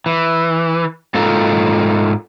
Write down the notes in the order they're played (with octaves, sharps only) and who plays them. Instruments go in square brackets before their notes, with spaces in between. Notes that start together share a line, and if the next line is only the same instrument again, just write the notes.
[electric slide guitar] E3
G#2 F4 A4 A#4